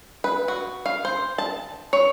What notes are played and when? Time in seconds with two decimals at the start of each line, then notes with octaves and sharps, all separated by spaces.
0.24 B4
0.48 F#4
0.86 F5
1.05 C5
1.38 A5
1.93 C#5